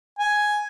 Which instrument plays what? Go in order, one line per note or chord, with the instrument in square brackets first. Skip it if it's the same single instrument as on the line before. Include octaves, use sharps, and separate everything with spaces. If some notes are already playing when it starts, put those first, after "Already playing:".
[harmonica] G#5